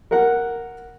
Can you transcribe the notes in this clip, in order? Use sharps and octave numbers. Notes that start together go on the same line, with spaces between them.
A#4 F#5